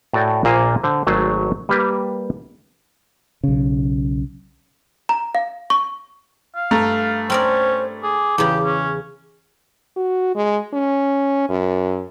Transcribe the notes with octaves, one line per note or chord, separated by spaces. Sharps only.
A2 F#4 A4 D5 G5 G#5
A#1 A#2 A#3 C5 F5 G#5
D3 C5
G#1 F#3 G#3 A3 C5 G#5
G3 A#3 G4 B4
B1 C#3
A#5
F5
C#6
F5
G2 A3 A#5
C4 C#4 A#4 C5 D5
G#4 D6
E2 C#3 G4
C#4
F#4
G#3
C#4
F#2